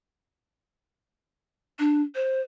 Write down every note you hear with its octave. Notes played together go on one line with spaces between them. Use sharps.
D4
C5